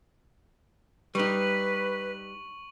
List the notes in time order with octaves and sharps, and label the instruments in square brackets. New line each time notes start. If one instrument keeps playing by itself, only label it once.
[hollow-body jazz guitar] G3 D#4 [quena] B4 [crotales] C#6 F#7